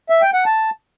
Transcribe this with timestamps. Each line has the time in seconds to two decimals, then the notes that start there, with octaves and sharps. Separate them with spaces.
0.10 E5
0.22 G5
0.34 F#5
0.46 A5